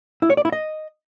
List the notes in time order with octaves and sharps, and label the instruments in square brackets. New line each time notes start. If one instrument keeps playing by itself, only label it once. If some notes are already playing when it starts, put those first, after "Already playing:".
[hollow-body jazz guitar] E4
C#5
D5
E4
D#5